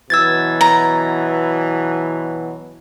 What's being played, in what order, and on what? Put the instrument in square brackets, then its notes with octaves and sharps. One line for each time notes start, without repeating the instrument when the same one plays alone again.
[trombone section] B2 E3 F#3 [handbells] E6 G#6 A6
[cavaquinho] A#5